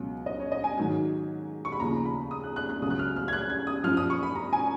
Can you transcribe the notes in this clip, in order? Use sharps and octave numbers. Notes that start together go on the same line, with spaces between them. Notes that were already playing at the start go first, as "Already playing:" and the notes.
Already playing: C#2 B2 F#3
D#5
C#5
D#5
G#5
G#2 D#3 F#3
C#6
B5
D#2 C#3 F3 A#5
B5
D#6
F#6
F#6
F#6
C#2 C#3 F#3 D#6
F#6
F6
F6
G#6
F#6
G#6
D#6
F#2 F3 F6
D#6
C#6
B5
A#5
G#5